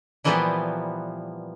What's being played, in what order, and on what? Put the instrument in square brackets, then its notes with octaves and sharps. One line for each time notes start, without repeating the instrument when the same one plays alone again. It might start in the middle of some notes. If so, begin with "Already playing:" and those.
[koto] A#2 E3 F3 G3 A#3 B3